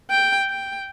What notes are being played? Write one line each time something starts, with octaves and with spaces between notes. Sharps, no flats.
G5
G5